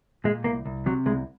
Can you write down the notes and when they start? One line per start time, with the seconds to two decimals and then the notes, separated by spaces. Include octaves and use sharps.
0.24 A#2 G#3
0.44 C2 A#3
0.66 C2
0.86 C3 F#3
1.06 C2 G#3